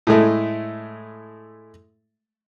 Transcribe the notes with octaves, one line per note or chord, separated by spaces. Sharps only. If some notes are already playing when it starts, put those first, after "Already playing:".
A2 G#3 A3 E4